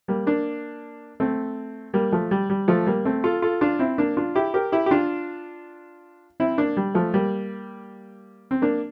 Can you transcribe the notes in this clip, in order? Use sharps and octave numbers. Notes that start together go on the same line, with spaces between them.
G3 A#3
A#3 D4
A3 C4
G3 A#3
F3 A3
G3
G3
F3 A3
G3 A#3
A3 C4
F4 A4
F4 A4
D4 F4
C4 E4
A#3 D4
D4 F4
E4 G4
G4 A#4
E4 G4
G4
D4 F4
C4 E4
A#3 D4
G3
F3 A3
G3 A#3
C4
A#3 D4